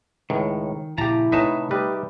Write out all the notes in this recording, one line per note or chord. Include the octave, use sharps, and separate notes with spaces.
C#2 A2 D#3
A#2 C#3 F3 E4 G4 A5 A#5
A2 C3 A3 D#4 B4 E5 G#5 A5
G3 D#4 G4 B4